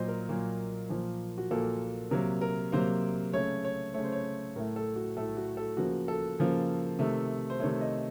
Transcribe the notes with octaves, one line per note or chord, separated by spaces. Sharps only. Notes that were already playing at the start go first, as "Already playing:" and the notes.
Already playing: A#2 F#3 A#3 C5 D#5
A#4
A#2 F#3 A#3
A#2 F3 A#3
F#4
A#2 F3 A#3 A4
C3 F#3 A#3 A#4
A#4
C3 F#3 A#3 C5
C#3 A3 C#5
C#5
C#3 A3 C#5
C5
C#5
A2 A3 A#4
A4
F#4
A2 A3 A4
F#4
A4
C#3 F3 A#3 F#4
A4
C#3 F3 A#3
C3 D#3 A3
C5
C3 D#3 A3 C#5
D#5